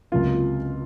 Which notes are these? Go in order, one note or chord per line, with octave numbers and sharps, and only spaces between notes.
C#2 C3 F#3 A#3 F4